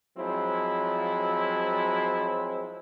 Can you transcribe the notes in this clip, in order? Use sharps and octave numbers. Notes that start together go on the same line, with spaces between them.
F3 F#3 G#3 C4 E4